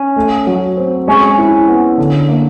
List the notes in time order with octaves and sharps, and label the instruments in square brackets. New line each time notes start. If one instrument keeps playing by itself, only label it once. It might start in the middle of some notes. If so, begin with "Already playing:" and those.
Already playing: [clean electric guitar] C#4
[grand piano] A3
F#3
C4
[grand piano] G#3 [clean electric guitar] C#4
[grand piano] E4
B3
D3
A#3